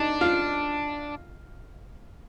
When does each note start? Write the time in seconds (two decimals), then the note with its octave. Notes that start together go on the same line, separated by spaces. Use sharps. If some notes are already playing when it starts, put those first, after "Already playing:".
Already playing: D4 D#4
0.21 F4